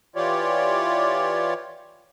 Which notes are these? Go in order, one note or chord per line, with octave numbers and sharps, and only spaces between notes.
E3 F4 G4 C#5 D5